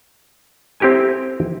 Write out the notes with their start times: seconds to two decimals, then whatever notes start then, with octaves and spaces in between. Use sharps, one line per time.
0.80 C4 E4 G4 A4 G#5